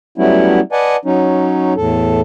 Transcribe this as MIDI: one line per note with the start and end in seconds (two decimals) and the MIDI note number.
0.18 0.60 54
0.18 0.60 55
0.18 0.60 57
0.18 0.60 59
0.18 0.60 61
0.18 0.60 64
0.72 0.96 71
0.72 0.96 74
0.72 0.96 75
0.72 0.96 78
0.72 0.96 80
0.72 0.96 81
1.05 1.73 54
1.05 1.73 61
1.05 1.73 63
1.77 2.21 40
1.77 2.21 45
1.77 2.21 69